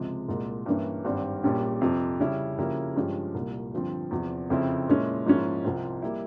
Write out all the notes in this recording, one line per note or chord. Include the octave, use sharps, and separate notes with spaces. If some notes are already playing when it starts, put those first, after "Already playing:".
Already playing: C#2 C3 F3 G#3
C2 A#2 G#3
G2 E3 A#3 C#4
G#1 G2 G3 C4
A#1 A#2 G3 C#4 G4
F2 C3 F3
C#3 G3 C#4 E4
C#3 F3 A#3 E4 G4
G2 F3 G#3 C#4 G4
C2 A#2 G3
G1 G2 F3 C4
E2 C3 F3
F2 C#3 F3 C4 E4
A#2 G#3 C#4 E4
G#2 F3 A#3 C#4 E4
C2 C3 F3 C4
G3 A#3 E4